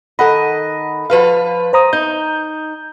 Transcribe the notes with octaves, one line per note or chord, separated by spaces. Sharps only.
D#3 A4 D#5 F#5 B5
F3 B4 F5
C5 A#5 D#6
D#4 G6